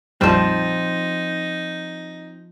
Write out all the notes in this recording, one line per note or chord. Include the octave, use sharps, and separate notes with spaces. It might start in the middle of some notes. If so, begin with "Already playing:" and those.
A#1 F2 F3 G3 C4 D#4